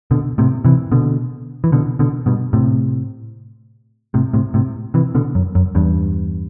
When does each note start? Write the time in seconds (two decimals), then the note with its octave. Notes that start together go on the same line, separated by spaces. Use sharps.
0.11 B2 D3
0.38 A2 C3
0.65 C3 E3
0.92 B2 D3
1.64 E3
1.72 B2 D3
1.99 B2 D3
2.26 G2 B2
2.53 A2 C3
4.14 A2 C3
4.33 A2 C3
4.54 A2 C3
4.94 C3 E3
5.15 B2 D3
5.35 F#2
5.55 F#2
5.75 E2 G2